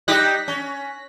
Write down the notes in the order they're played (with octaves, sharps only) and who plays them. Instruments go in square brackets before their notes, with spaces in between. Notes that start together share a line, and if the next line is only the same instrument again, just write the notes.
[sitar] G3 D#4 G4 [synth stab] F#6 A#6 B6
[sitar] C#4